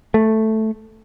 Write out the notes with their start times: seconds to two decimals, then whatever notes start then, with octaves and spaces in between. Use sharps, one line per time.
0.14 A3